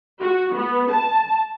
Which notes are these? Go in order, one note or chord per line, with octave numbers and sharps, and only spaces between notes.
F#4
B3
A5